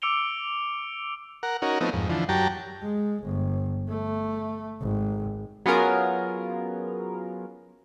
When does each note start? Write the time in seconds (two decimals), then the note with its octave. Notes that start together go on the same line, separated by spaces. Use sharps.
0.02 D6 E6 C#7 D7 F7 G7
1.43 A#4 F#5
1.62 C#4 D#4 F#4 A#4
1.81 F3 A3 B3 C4 D#4
1.93 F2 G#2
2.09 D3 E3 F3
2.29 F#2 F#3 G4 G5 A5 A#5
2.83 G#3
3.24 G1
3.89 A3
4.81 G#1
5.66 F#3 B3 C#4 F4 G#4 A#4